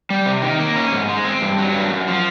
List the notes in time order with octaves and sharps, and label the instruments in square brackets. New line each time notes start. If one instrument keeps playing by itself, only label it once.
[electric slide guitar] G3
C3
D#3
A#3
C#4
G#2
G#3
C4
G2
F#3
G2
F#2
F3